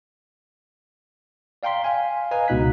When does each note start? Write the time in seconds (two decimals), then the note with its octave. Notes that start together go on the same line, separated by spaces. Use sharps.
1.63 D5 F5 G5 A#5 C6 B6
1.84 F5 G#5
2.31 B4 D#5 F5 G#5 A#5
2.48 C#2 B2 D#4 F#6 B6